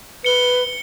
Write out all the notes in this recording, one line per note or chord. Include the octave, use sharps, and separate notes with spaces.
B4 C#7 G7